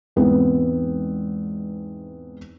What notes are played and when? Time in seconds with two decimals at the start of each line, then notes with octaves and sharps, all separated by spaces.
0.16 E2 G#2 B3 C4